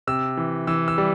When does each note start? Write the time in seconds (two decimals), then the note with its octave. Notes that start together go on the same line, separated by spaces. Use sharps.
0.07 C3 E6
0.37 E3
0.67 E3 E6
0.88 E6
0.98 G3